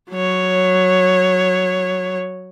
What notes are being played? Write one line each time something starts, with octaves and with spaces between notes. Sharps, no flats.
F#3 C#5